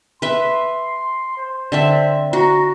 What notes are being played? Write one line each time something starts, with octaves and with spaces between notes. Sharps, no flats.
B4 E5 C6
C5
D3 C4 E5
F#4 A#5